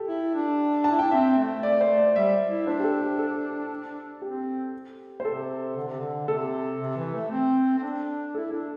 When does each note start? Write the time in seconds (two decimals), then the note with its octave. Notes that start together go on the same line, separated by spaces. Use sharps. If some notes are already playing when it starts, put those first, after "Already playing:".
Already playing: G4 A4
0.08 E4
0.35 D4
0.84 A5
0.91 E4
0.99 D4 G5
1.11 C4 E5
1.38 A3
1.63 D5
1.81 C5
1.98 D5
2.15 G3 E5
2.49 E4
2.66 D4 C5
2.79 G4
2.84 A4
3.01 G4
3.18 A4
4.22 C4 G4
5.20 C5
5.25 C3 A4
5.76 D3
5.88 C3
6.00 D3
6.28 C3 A4
6.80 C3
6.97 E3
7.14 A3
7.31 C4
7.77 C4
7.82 D4
8.35 E4 A4
8.51 D4 A4